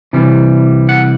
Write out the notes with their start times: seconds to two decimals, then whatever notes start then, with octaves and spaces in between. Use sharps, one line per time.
0.13 C3 E3 G3
0.89 F#5